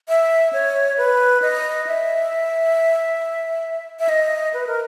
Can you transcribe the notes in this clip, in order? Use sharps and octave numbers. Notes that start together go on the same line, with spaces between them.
E5
C#5
B4
D#5
E5
E5
D#5
B4
A#4